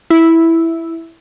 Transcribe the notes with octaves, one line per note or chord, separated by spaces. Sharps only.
E4